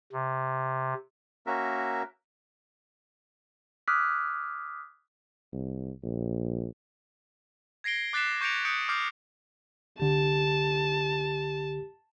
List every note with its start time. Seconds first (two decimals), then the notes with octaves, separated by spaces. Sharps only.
0.12 C3
1.47 A#3 C#4 F#4 A#4 E5
3.88 D6 D#6 F6 F#6 G#6 B6
5.53 C2
6.03 A#1
7.84 G#6 A#6 C7 D7 G7
8.13 D6 F#6 A6 B6 C7 E7
8.41 C#6 G6 A#6 C#7 D7 F7
8.65 D#6 F#6 G6 C#7 D7
8.88 C#6 D6 F6 G6 C7
9.99 C2 D3 G4 A5